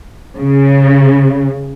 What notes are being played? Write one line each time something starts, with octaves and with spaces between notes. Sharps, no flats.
C#3